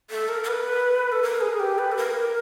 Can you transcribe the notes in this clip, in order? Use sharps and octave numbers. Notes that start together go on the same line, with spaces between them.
A4
A#4
A#4
B4
A4
A#4
G#4
G4
B4
A4
A#4